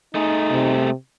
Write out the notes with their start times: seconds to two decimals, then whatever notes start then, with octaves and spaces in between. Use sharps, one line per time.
0.15 A3 D#4 G#4
0.50 C3